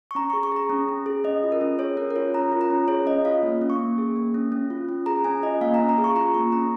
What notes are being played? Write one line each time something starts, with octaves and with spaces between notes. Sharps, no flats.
C#6
C#4 A#5
C#6
G#4
C#6
G#4 A#5
C#4
C#4
G#4
C#4 D#5
F4
A#4
C#4
G#4 C#5
C#4 A#4
A#4
F4 C#5
C#4 A#5
F4
A#5
C#4
G#4 C#5
C#4 D#5
F4 F5
A#3
C#4
C#6
A#3
G#4
A#3
C#4
C#4
F4
C#4
G#4 A#5
C#4 G#5
F4 D#5
A#3 F5
A#5
C#4
A#5
G#4
C#6
F4 A#5
A#3 C#6
C#4 A#5